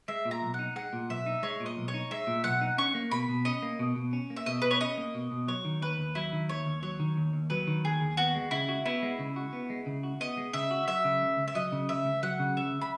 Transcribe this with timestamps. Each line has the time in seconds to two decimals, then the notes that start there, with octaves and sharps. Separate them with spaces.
0.08 G#3 E5
0.25 A#2
0.31 A#5
0.42 B1
0.54 D#4 F#5
0.76 G#3 F#5
0.93 A#2
1.09 B1 E5
1.26 D#4
1.43 G#3 C#5
1.60 A#2
1.66 D#5
1.77 B1
1.88 C#5
1.94 D#4
2.11 G#3 E5
2.27 A#2
2.44 B1 F#5
2.61 D#4
2.78 C#4 C#6
2.95 A#3
3.11 B2 B5
3.29 B2
3.45 C#4 D#5
3.62 A#3
3.79 B2
3.96 B2
4.13 C#4
4.30 A#3
4.36 E5
4.46 B2 D#5
4.62 B2 B4
4.71 C#5
4.80 C#4 D#5
4.98 A#3
5.15 B2
5.31 B2
5.48 F#3 C#5
5.65 D#3
5.82 D#2 B4
5.99 D#2
6.15 F#3 E4
6.33 D#3
6.49 D#2 C#5
6.66 D#2
6.83 F#3 C#5
7.00 D#3
7.17 D#2
7.33 D#2
7.50 F#3 B4
7.67 D#3
7.84 D#2 G#4
8.01 D#2
8.17 B3 F#4
8.35 G#3
8.51 C#3 E4
8.69 F#4
8.86 B3 E4
9.02 G#3
9.19 C#3
9.36 F#4
9.53 B3
9.70 G#3
9.86 C#3
10.03 F#4
10.20 B3 D#5
10.37 G#3
10.53 C#3 E5
10.71 F#4
10.88 F#3 E5
11.04 C#3
11.21 C#2
11.38 C#2
11.48 E5
11.55 F#3 D#5
11.72 C#3
11.89 C#2 E5
12.06 C#2
12.23 F#3 F#5
12.40 C#3
12.57 C#2 E5
12.81 B5